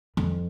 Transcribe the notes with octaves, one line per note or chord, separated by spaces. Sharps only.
F2